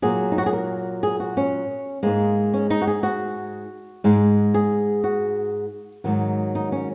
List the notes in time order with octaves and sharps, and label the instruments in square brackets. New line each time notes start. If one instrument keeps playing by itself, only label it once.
[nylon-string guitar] A#2 F#3 G#4
D#4
F#4
G#4
A#4
G#4
F#4
C#4
G#2 G#3 A#3
C#4
D#4
F#4
G#4
F#4
G#2 G#3
G#4
F#4
G#2 D#3 F#3
D#4
C#4